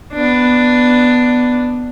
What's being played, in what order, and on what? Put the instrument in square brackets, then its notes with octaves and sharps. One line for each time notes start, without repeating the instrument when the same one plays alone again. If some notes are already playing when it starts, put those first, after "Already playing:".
[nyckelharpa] B3 D4